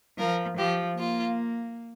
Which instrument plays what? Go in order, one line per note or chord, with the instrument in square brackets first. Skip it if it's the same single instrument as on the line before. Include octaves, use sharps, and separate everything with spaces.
[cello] F3 [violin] A#4
[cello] F3 [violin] G4
[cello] A#3 [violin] F4